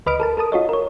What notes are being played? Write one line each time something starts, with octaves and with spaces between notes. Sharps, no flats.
D2 B4 D#5 B5 F6 D7
A4 A#4 A5
A4 A#4 A5 D#6
F4 F#4 C#5 D#5
A#4 C#5